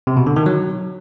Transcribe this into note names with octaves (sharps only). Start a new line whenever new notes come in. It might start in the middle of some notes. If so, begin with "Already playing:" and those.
C3
B2
D3
D#3
F#3